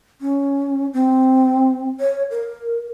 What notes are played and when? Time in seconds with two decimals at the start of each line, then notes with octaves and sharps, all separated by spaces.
0.21 C#4
0.94 C4
2.00 C#5
2.31 A#4